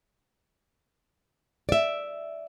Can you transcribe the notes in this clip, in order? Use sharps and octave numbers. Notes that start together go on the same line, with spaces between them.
D5 E5